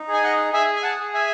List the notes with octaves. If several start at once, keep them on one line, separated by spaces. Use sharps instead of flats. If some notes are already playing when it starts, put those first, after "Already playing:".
Already playing: D#4
G#4
G#5
D#5 F#5
G#4 E5 G#5
G#5
F#5 A5
G#4
E5 G#5